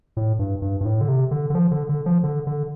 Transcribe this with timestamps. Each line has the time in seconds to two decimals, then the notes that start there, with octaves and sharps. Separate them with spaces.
0.17 A2
0.39 G2
0.62 G2
0.81 G2
0.85 A2
1.01 D3
1.08 C3
1.31 D3
1.50 D3
1.55 F3
1.71 D3
1.89 D3
2.06 F3
2.23 D3
2.47 D3